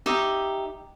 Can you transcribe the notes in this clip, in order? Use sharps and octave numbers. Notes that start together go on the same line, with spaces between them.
D#4 G4 E5 C#6